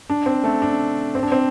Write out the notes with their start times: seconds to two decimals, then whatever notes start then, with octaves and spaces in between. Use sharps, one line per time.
0.10 D4
0.26 C4
0.44 A3
0.62 D4
1.15 C4
1.23 D4
1.32 C4